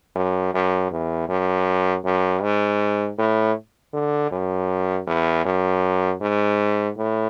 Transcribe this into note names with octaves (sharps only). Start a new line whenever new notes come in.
F#2
F#2
E2
F#2
F#2
G#2
A2
D3
F#2
E2
F#2
G#2
A2